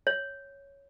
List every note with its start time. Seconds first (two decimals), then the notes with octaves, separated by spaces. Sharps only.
0.07 C#5